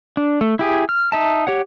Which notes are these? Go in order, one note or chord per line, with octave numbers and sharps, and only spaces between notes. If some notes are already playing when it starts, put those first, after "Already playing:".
D4
A3
E4 G4 G#4
F6
D#4 E5 A5
G4 C#5 F#5